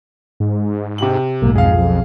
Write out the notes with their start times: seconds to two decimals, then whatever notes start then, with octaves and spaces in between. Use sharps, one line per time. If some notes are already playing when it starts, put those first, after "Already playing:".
0.40 G#2
0.98 C3 G4 F#7
1.42 B1 G#2 A#3
1.55 F2 G#4 F5
1.73 B1